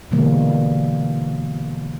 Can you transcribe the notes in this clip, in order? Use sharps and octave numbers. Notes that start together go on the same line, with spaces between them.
B2 D3 E3 G3 G#3 A#3